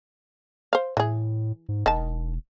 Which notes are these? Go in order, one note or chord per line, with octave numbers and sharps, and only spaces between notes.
C5 F5
A2 E3 G#4
G#2
E1 D#3 A5